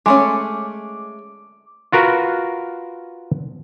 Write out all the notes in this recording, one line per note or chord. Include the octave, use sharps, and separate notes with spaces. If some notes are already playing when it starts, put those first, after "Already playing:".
G#3 A3 C#4 D6
F4 F#4 A#4 B4 F#5